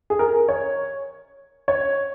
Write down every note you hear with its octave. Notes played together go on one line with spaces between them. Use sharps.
G#4
A#4
C#5
C#5